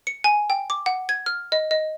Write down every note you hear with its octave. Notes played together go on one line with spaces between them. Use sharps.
C#7
G#5
G5
D6
F#5
G#6
F6
D#5
D#5